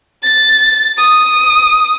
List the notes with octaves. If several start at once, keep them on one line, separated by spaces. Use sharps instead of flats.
A6
D#6